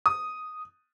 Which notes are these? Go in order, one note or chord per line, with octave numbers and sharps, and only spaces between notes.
D#6